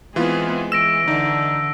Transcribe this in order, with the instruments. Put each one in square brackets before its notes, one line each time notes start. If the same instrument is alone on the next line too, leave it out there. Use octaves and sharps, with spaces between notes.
[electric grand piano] E3 F4 [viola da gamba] G#3 [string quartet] B3 C4 G#4
[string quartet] E3 [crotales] E6 A#6 D7 [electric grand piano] E7
[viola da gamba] D3 [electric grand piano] D#4